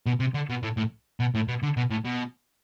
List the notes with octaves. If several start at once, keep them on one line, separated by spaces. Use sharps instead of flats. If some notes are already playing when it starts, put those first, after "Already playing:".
B2
C3
D3
B2
A2
A2
B2
A2
B2
D3
B2
A2
B2